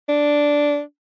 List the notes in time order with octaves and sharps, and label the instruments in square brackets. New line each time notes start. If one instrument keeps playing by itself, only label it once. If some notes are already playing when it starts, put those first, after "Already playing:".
[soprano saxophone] D4